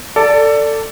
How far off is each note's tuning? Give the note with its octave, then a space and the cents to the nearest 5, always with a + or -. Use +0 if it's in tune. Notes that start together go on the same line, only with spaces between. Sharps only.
A4 +20 D5 -10